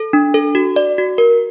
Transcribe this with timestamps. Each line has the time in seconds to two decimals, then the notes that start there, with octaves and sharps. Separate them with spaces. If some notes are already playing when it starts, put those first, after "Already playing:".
Already playing: A4
0.13 D4
0.34 A4
0.55 F#4
0.76 D5
0.98 F#4
1.18 A#4